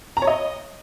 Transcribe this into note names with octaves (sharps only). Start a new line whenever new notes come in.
A#5
C#5
D#5